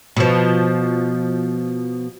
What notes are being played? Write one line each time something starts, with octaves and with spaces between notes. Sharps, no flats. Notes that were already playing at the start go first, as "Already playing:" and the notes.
B2 F3